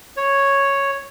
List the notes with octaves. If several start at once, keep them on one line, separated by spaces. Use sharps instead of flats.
C#5